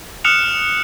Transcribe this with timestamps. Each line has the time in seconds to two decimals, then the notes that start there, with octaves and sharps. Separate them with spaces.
0.24 D#6 F6 F#6 C#7 E7 F7